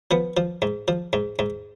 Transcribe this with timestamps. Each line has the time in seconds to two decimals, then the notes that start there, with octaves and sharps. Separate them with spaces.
0.11 F3 B3
0.37 F3
0.62 G#2
0.88 F3
1.13 G#2
1.39 G#2